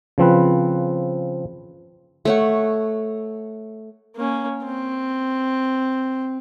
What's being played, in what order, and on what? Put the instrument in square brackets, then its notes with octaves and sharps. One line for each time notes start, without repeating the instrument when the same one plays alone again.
[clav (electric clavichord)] C#3 F3 C4 B4
[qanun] A3 C#5 F#5
[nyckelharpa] A#3 C#4
C4